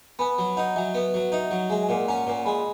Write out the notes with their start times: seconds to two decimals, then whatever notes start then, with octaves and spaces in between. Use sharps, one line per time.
0.19 B3 G#5 B5
0.38 F#3
0.57 D#4 F#5 A#5
0.75 F#3 E5 G#5
0.94 B3
1.14 F#3
1.32 D#4 E5
1.43 E5
1.51 F#3 F#5
1.70 G#3 E5
1.82 G#5
1.89 A#2 F#5
2.08 C#4 F#5 A#5
2.27 A#2
2.45 G#3 G#5 B5